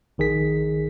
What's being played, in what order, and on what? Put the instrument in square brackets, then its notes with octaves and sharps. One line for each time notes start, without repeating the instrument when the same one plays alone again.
[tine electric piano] A#1 D#3 G#4 B6